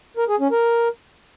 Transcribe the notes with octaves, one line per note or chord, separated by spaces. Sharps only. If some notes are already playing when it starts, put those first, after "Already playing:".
A#4
G#4
C#4
A#4